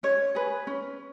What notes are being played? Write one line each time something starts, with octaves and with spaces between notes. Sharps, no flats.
C#4 C#5
G#4 B4
C#4